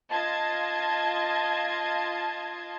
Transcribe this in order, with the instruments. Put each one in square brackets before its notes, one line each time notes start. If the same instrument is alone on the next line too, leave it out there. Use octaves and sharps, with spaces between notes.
[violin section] F4 D#5 A5 G#6